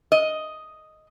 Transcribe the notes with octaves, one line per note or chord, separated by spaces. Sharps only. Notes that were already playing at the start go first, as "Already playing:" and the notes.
D#5